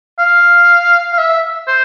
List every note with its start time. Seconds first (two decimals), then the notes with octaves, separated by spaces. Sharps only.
0.19 F5
1.13 F5
1.18 E5
1.67 C5